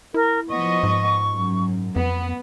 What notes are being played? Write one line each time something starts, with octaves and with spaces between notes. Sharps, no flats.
E4 A#4
F3 B3 D#5 C#6
G#2
F#2
F2 B3